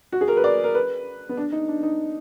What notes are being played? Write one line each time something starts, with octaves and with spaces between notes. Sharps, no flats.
F#4
G#4
A#4
B4
D5
A#4
B4
B3
D4
D#4
D4
D#4